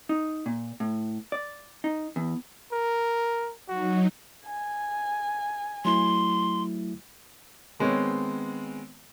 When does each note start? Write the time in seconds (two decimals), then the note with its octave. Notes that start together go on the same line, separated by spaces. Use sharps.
0.09 D#4
0.46 A#2
0.80 A2
1.32 D5
1.84 D#4
2.16 E2
2.72 A#4
3.68 F#3 D#4 F#4
4.47 G#5
5.85 F#3 A3 E4 C6
7.80 D#3 G#3 B3 C4 C#5